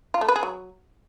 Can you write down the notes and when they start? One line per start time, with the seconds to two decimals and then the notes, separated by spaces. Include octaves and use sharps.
0.14 F4
0.21 A3
0.28 B4
0.36 G#4
0.43 F#3